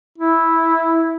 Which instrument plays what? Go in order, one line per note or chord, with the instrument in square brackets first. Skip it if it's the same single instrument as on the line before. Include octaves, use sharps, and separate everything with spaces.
[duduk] E4